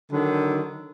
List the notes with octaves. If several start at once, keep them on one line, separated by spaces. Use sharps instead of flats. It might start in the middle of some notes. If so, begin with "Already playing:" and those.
D3 D#3 F#3